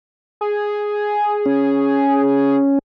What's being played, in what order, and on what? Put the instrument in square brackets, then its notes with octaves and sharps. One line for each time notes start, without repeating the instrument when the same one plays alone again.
[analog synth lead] G#4
[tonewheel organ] C#4